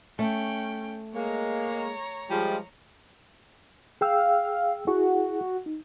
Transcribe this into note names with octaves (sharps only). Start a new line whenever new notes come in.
A3 C#4 G5
G#3 A#3 C#5 A#5
F3 G3 G#3
G#4 F5 G5 E6
E4 F#4 G#4
D#4